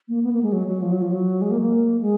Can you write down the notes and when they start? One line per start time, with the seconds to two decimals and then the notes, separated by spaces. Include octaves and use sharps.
0.08 A#3
0.23 B3
0.33 A#3
0.43 G#3
0.52 F#3
0.68 F#3
0.82 F3
0.92 F#3
1.02 F3
1.11 F#3
1.41 G#3
1.51 A#3
1.61 A#3
2.01 G#3